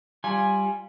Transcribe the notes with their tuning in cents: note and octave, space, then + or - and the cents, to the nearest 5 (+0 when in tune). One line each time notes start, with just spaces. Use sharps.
G3 +0 F4 +0 G#5 +0